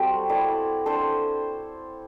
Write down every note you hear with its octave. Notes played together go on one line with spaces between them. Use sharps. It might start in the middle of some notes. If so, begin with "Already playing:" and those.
Already playing: G3 C4 F#4 A4
E4 A4 D5
D4 A4 C5